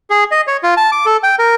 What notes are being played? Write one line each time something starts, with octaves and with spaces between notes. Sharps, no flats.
G#4
D#5
C#5
F4
A5
D6
A4
G5
A#4